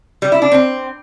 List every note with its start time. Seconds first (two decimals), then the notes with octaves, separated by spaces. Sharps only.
0.22 G3
0.32 E4
0.42 D4
0.52 C4